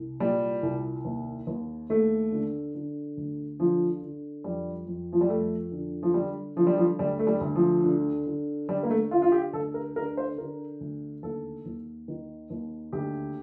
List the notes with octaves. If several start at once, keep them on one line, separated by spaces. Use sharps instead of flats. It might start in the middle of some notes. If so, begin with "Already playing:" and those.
Already playing: C2
A#2 G3
C2
D#2
D#2
D#2 A3
D3
D3
D2
D3 F3
D3
F2 G3
F2
F3
G3
F2 A3
D3
F3
D3 G3
D3 F3
G3
F3
D2 G3
A3
G3
D2
F3
D3
D3
D3 G3
A#3
A3
D3 F4
F4
G4
D2 A4
A#4
D3 A#4
C5
D3 A#4
D2
D#2 A4
D#2
D#3
D#2
D2 G4